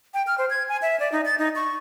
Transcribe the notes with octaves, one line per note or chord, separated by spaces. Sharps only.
G5
F6
C5
G#6
G#5
E5
D5
D#4
A6
D#4
C#6